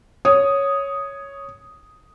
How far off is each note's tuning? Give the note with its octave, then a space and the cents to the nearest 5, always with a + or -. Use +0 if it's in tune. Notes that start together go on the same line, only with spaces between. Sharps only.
C#5 +0 D#6 +0